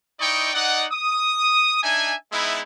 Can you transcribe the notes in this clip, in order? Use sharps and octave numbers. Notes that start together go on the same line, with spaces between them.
D#4 E4 D5 D#5 G5 C#6
D#4 D5 D#5 F#5
D#6
D4 D#4 E5 G#5
G#3 B3 D#4 E4